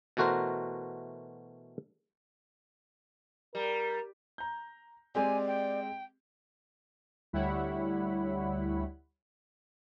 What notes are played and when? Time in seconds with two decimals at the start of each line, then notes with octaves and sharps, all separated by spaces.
0.17 B2 E3 A3 F#4 A#4 C5
3.55 G3 A#4
4.38 A#5 G6
5.15 G#3 C4 G4 D5 G#5
5.47 G5
7.33 D2 G3 E4 C#5 F#5 B5